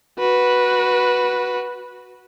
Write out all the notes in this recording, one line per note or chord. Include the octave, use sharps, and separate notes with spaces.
F#4 B4